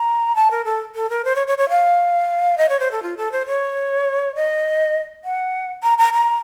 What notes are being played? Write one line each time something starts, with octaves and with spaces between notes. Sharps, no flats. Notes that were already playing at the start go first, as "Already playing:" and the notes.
Already playing: A#5
A5
A#4
A4
A4
A#4
C5
C#5
C#5
C#5
F5
D#5
C#5
C5
A4
F4
A4
C5
C#5
D#5
F#5
A#5
A#5
A#5